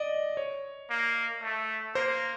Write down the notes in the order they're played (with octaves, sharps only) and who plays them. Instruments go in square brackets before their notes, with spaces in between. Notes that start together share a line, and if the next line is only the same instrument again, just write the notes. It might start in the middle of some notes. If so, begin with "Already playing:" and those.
Already playing: [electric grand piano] D5 D#5
C#5
[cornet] A#3
A3
[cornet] A#3 [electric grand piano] C5